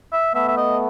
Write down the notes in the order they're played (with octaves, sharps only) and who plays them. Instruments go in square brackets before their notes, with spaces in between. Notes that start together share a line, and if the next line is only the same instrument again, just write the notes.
[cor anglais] E5
[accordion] A3 B3 [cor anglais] E5
[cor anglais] E5
D#5